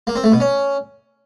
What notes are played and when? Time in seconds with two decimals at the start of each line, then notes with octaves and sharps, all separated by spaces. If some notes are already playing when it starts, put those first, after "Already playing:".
0.07 A#3
0.15 C4
0.24 A3
0.32 B2
0.40 C#4